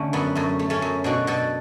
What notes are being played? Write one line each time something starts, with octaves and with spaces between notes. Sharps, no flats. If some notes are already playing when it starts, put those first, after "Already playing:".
Already playing: D3 A3 C#4
F#2 B3
F#2 A3
A3
A3 C#4
F#2
B2 D4 F#4
B2 F#4 A4